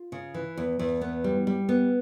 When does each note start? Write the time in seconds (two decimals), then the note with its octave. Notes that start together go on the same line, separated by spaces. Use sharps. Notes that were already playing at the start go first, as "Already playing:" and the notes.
Already playing: F4
0.12 C#3
0.34 E3
0.57 E2
0.79 E2
1.01 B3
1.24 G3
1.47 G3
1.69 B3